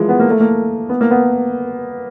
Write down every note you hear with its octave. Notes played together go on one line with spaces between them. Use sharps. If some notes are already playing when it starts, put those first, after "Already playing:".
Already playing: E3 F3 G#3
B3
A#3
A3
A#3
B3
A#3
B3